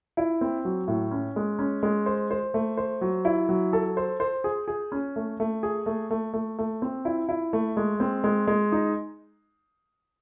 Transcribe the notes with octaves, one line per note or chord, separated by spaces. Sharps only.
E4
C4
F#3
A2
C#4
G#3
C#4
G#3
C5
C5
A3
C5
F#3
E4
F#3
A4
C5
C5
G#4
G#4
C#4
A3
A3
G#4
A3
A3
A3
A3
C4
E4
E4
A3
G#3
C4
G#3
G#3
D#4